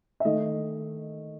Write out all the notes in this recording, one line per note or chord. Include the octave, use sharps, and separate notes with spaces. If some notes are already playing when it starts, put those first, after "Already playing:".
E5
D#3 A3 D#5